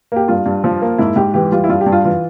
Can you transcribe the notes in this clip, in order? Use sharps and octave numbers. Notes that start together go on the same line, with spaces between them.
A#3 G4
G2 F4
G2
F3
A#3
G#2 E4
G#2 G4
E3 G4
G3 F4
E4
G2 F4
G4
G2
F4
E3 F4